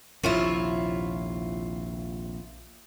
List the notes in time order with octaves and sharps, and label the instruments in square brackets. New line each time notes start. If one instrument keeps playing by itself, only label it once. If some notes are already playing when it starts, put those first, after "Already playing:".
[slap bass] A#1 D#2 C3 [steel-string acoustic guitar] E4 F4 C#5